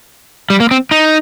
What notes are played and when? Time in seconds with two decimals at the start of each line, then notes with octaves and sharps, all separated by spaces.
0.50 G3
0.60 A#3
0.71 C4
0.91 D#4